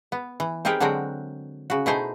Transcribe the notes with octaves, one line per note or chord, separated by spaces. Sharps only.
B3
E3
C4 D#4 G4 G#4 A#4 B4
D3 F#3 G#3 C4 F#4 A#4
C#3 F#4
B2 A3 D#4 E4 G#4 C5